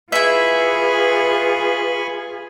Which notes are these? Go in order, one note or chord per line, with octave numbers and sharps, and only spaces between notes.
E4 F4 G#4 B4 E5 G#5 B5 C#6